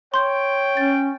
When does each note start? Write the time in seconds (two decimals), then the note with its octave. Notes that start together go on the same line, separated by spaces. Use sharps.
0.14 C#5 G5 C6 G6
0.77 C#4 A6